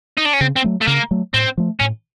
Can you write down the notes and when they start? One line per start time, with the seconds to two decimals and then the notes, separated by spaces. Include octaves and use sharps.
0.18 D#4
0.26 D4
0.34 C#4
0.41 C#3 C4
0.56 C4
0.64 F#3 A3
0.81 A3
0.87 C#3 A#3
1.11 F#3 A3
1.34 A2 C4
1.58 F3 A3
1.80 A2 C#4